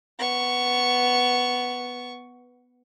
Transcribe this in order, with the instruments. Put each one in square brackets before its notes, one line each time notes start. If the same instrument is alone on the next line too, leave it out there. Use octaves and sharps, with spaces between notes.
[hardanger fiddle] B3 C#6